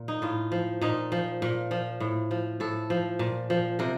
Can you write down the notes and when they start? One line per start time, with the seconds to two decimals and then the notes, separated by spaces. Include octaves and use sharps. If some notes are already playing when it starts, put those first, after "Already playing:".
Already playing: A#2
0.08 D#4
0.22 A2 F4
0.52 F3
0.81 A#2 D#4
1.12 F3
1.42 A#2
1.71 F3
2.00 A2
2.31 F3
2.60 A2 A4
2.90 F3
3.19 A#2
3.50 F3
3.79 C3 A#4